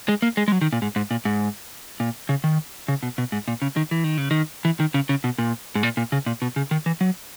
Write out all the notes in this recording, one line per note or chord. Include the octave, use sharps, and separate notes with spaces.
G#3
A#3
G#3
G#3
F#3
D#3
A#2
G#2
G#2
A#2
G#2
A#2
C#3
D#3
C#3
B2
B2
G#2
A#2
C#3
D#3
E3
D#3
C#3
D#3
E3
D#3
C#3
C#3
B2
A#2
G#2
A#2
A#2
C#3
A#2
B2
C#3
D#3
E3
F#3